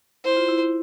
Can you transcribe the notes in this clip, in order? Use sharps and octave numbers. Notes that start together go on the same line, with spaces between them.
E4 C5
F4
E4
E4